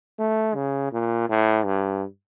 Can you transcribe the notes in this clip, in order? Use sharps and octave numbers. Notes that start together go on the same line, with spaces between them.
A3
C#3
A#2
A2
G2